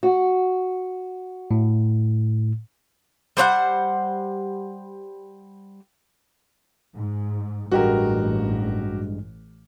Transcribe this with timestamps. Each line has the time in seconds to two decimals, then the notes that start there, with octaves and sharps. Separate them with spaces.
0.03 F#4
1.51 A2
3.37 G3 C5 C#5 F#5
6.96 G#2
7.72 A1 G2 G#3 F#4 G4 A#4